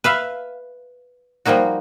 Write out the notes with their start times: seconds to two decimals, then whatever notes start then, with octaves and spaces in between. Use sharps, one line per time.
0.04 B4 E5 F5
1.45 F3 G3 A#3 D#4 F#4